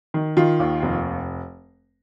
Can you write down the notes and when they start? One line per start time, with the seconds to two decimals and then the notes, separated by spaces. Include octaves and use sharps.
0.14 D#3
0.37 D#3 F4
0.60 D#2
0.82 F1